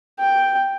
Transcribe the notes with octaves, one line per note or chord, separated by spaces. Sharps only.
G5